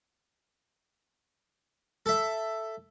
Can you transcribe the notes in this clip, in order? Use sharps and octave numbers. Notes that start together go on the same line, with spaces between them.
A4 E5